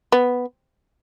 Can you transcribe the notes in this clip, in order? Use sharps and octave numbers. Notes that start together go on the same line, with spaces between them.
B3